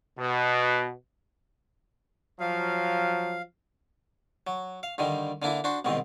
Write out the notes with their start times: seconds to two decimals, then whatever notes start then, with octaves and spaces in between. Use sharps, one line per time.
0.18 B2
2.40 F3 F#3 F5
4.47 F#3
4.83 F5
4.98 G2 D3 D#3 G3
5.42 D3 A#3 D4 E4
5.64 D4 F#4 C5
5.85 C2 G#2 B2 D#3 C4